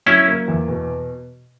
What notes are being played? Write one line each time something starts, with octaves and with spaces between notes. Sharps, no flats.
F#3 C#4 E4
A#3
E2
B2